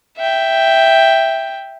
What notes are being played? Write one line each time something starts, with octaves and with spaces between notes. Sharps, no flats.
E5 G5